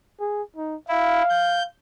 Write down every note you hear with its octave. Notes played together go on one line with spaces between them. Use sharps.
G#4
D#4
E4 F5
G6